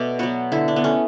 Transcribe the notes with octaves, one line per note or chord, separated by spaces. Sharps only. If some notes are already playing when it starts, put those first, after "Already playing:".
Already playing: B2 A3 D5
F#3 B3 F#4
D3 E4
D4
B3
A3 C#4